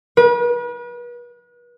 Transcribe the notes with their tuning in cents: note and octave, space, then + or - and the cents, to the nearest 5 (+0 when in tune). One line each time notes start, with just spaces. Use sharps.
B4 -40